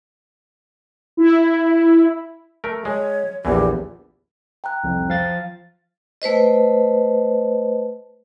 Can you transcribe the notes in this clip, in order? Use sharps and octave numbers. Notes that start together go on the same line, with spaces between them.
E4
A3 A#4
G#3 C#5
A#1 E2 E3 G4
G5 A#5 F#6
C2 F2
F3 F5 A6
A3 B4 C5 D#5